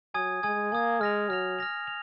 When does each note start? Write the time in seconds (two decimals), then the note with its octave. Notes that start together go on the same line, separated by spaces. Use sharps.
0.14 F#3 G#5 D#6 G#6
0.43 G#3 G#5 D#6 G#6
0.72 A#3 G#5 D#6 G#6
1.00 G#3 F6 A#6 F7
1.29 F#3 F6 A#6 F7
1.59 F6 A#6 F7
1.88 F7